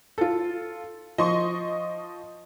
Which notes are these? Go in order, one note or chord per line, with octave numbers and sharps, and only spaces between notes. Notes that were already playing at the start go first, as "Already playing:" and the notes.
F4 A4
F3 D#5 C6 C#6